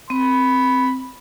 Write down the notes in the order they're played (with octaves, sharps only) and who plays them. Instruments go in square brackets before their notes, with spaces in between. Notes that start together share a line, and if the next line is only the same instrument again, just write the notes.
[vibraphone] C4 [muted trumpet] B5